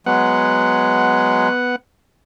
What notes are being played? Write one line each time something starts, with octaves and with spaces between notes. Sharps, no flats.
F#3 G#3 B3 F#5